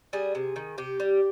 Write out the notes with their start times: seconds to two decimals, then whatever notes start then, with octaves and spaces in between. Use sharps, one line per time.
0.13 G3 G#4
0.35 C3
0.56 D#3
0.78 C3 G4
1.00 G3